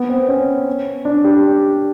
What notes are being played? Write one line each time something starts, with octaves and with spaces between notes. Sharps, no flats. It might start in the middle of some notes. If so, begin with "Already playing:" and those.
Already playing: B3
C4
C#4
D4
G4